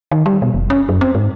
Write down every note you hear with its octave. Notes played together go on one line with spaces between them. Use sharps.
D#3
G3
B2
F1
C#4
F#2
C4
G#2